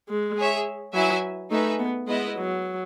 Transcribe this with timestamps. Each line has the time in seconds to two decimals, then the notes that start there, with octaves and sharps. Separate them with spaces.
0.09 G#3
0.37 G#4 C#5 E5
0.94 F#3 E4 B4 E5 G#5
1.50 A3 D#4 G#4 B4 E5
1.79 B3
2.07 G#3 B3 E4 B4 D#5
2.36 F#3